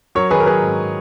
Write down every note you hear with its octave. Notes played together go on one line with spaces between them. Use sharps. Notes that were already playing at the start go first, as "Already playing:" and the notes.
F#3 A#4 C#5
D#3 G#4 B4
A#4
F#3 G#4 B4
G#2